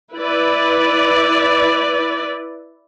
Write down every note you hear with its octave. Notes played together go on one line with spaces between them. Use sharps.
E4 B4 D5